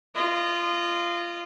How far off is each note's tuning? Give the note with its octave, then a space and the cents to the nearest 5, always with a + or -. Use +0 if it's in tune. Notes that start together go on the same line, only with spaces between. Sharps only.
F4 -20 D#5 -30